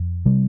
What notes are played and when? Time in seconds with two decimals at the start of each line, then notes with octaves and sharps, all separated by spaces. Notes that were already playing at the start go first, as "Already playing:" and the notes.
Already playing: F2
0.26 C3 G3